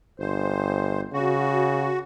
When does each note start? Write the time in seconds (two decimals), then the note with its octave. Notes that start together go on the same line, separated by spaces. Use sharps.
0.19 G1 C5
1.13 C#3 F#4